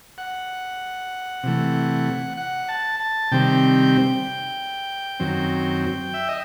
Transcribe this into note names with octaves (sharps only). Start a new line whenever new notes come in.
F#5
C3 E3 A3
F#5
A5
A5
C3 D#3 G3 C4 G5
F#2 D#3 F#3 C4
E5
D#5